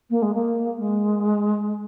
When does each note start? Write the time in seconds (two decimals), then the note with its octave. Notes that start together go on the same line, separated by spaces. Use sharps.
0.10 A#3
0.22 G#3
0.34 A#3
0.79 G#3